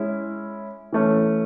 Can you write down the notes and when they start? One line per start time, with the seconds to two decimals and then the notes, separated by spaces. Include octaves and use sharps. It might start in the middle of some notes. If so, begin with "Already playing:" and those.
Already playing: G#3 C#4 E4
0.93 E3 A3 C#4